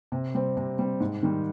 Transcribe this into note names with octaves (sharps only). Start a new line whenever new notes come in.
C3
G3 C4
C3
G3 C4
G#2
D#3 G3